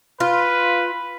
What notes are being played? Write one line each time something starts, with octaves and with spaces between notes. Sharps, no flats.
F4 B4